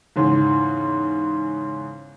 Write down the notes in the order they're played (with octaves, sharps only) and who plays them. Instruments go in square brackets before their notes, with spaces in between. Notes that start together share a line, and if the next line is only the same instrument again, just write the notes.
[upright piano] E2 G#2 C#3